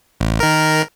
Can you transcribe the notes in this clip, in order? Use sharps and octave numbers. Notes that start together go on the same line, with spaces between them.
A1
D#3 A#4